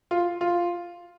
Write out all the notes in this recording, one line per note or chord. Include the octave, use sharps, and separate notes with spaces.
F4
F4